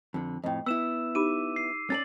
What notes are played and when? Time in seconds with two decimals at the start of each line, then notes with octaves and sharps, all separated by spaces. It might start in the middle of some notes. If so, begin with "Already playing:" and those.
0.14 F2 D3
0.44 F2 A2 D#5 G5
0.66 B3 E4 E6 E7
1.15 D#4 G4 B5 D6 D#7
1.56 C7
1.90 C#4 A4 D5 A6 F#7